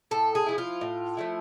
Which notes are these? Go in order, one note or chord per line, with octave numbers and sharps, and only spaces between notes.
A2 A4
G#4
F3 A3 E4
F4
A2
F3 A3 E4